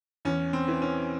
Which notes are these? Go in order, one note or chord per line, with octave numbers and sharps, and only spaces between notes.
E2 C#4
C4
E3
C#4